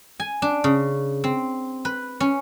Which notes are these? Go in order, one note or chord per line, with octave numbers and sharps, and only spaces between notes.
G#5
D4
C#3
C4
B4
C#4